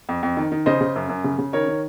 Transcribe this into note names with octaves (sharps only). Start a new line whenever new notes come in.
F2
F2
D#3
D#3
C#3 C5 D#5
C#3
F#2
F#2
C#3
C#3
D#3 A#4 C#5
D#3